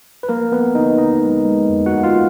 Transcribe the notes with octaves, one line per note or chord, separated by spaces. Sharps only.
B4
F3 A#3 A#4
F3 B3 B4
D3 D#4 D#5
D3 D#4 D#5
G#3
G#3
F2
F#4 F#5
G#3
F4 F5